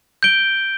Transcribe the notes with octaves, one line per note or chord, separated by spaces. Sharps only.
G6 D7 G7